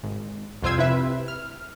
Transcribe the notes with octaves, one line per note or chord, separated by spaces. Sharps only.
G#1
C2 F2 F4 C5 E6 G#6
C3 E4 B4 E5
F6